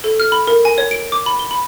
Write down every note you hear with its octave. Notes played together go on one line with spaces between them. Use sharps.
A4
F6
B5
A#4
G#5
C#5
D7
D6
B5
G7
B5